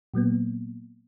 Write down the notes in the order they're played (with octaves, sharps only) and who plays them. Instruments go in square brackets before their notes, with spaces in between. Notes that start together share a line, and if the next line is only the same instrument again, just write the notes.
[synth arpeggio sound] A#2 F#3 A#3 B3